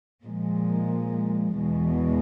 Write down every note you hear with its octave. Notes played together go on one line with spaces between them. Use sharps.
A#2 F3 G#3
E2 B2 G#3